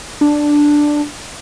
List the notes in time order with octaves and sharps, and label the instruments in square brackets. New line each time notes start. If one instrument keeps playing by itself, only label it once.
[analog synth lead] D4